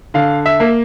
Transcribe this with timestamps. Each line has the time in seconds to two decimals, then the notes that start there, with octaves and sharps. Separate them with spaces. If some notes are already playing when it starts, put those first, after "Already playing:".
0.14 D3 F5
0.46 E5
0.60 A#3